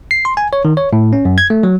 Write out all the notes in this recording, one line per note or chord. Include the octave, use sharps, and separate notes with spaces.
C7
C6
G#5
C#5
D#3
C#5
A2
C#4
F#2
G#6
A3
F#3